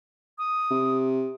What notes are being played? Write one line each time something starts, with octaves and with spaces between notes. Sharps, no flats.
D#6
C3